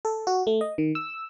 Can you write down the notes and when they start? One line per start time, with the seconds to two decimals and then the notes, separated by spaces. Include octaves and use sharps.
0.05 A4
0.27 F#4
0.47 A3
0.61 D#5
0.78 D#3
0.95 E6